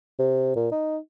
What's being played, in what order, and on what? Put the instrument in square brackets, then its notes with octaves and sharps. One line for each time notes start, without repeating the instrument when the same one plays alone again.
[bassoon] C3
A#2
D#4